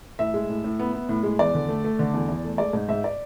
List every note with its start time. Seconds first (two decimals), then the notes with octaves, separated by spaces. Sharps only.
0.19 A2 E5
0.34 G#3
0.49 A2
0.64 A2
0.79 B3
0.93 B3
1.09 A2
1.23 G#3
1.39 E2 D5
1.54 D3
1.69 A3
1.84 A3
1.99 D3
2.14 E2
2.28 E2
2.44 A3
2.58 G#3 D5
2.73 G#2
2.89 G#2 E5
3.04 D5